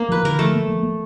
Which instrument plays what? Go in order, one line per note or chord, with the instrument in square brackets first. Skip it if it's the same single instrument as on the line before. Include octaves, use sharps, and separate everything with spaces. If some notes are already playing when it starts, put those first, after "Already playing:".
Already playing: [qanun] A#3
[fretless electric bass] F3 [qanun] B4
[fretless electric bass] D3 [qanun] A#4
[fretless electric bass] F3 [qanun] A3 A4
[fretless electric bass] A#3
F3
A#3